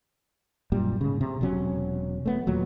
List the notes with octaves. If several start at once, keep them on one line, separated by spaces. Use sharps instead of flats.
F#2 A#2 G3
G#2 C#3
C3
E1 C3 F#3 C#4
A3 B3
D#2 A#2 F#3